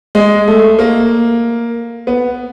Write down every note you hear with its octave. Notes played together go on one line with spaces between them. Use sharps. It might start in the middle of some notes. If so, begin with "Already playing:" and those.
G#3
A3
A#3
B3